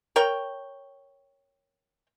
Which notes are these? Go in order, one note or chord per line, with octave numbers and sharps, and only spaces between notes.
A#4 C#5 G5